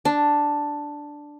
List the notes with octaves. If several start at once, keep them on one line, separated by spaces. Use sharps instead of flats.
D4